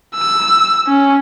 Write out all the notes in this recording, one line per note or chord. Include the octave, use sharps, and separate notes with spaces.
E6
C#4